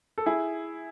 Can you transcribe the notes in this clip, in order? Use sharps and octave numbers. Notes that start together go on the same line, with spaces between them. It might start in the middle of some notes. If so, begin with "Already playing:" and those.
A4
E4 G#4